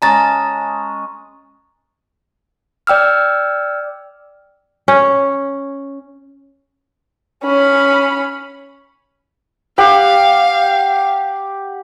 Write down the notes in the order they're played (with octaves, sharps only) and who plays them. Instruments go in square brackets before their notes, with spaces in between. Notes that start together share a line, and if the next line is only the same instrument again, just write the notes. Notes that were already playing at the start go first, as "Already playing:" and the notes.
[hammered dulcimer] G#3 C#4 D#5 [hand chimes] A5 A#5 A6
[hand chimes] D5 G5 E6 F6
[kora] C#4
[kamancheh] C#4 B5
[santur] G4 F#5 [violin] F5